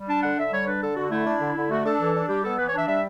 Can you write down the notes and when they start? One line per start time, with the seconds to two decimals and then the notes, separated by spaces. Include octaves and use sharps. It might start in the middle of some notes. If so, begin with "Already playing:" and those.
Already playing: G3
0.09 D4 A5
0.23 D3 F#5
0.39 D3 E5
0.53 G3 C#5
0.67 D4 B4
0.83 D3 A4
0.96 D3 F#4
1.11 A3 E4
1.26 D4
1.42 D3
1.56 D3
1.70 A3 F#4
1.85 D4 A4
2.00 E3
2.15 D4
2.29 G3 G4
2.44 B3 A4
2.58 E3 B4
2.68 C#5
2.73 D4 E5
2.88 G3 E5